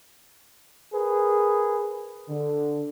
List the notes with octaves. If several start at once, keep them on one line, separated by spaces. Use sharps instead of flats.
G#4 A#4 B4
D3